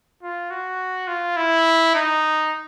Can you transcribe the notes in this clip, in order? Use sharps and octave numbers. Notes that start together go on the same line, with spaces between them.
F4
F#4
F4
E4
D#4